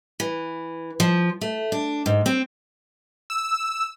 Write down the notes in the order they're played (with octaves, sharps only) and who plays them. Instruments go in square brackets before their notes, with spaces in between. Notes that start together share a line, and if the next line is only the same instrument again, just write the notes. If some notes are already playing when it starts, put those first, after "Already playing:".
[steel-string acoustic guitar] E3
F3
A3
D4
G#2
C4
[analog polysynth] E6